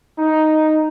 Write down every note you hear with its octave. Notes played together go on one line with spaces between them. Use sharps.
D#4